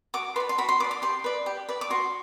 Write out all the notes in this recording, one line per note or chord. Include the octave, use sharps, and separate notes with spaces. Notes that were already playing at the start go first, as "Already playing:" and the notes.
F#4 D6
B4 D5 C6
C6
F#4 B5
C6
B4 D5 D6
D6
G4 C6
B4 D5
G4
B4 D5
D6
F#4 C6